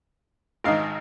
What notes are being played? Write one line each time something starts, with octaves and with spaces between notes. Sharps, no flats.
G#1 G#2 D#3 F5